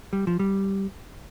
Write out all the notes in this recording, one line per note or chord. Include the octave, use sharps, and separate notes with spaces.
G3
F3
G3